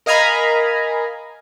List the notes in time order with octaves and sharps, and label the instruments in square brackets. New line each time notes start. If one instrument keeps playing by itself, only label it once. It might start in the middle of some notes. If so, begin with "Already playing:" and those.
[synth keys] A#4 D#5 F5 G#5 A#5 B5